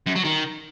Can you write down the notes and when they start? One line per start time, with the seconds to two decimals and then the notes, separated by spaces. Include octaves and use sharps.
0.07 F#2
0.16 F#3
0.25 D#3